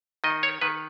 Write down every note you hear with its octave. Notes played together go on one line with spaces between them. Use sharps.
D#3 D#5
C#5
D#3 B4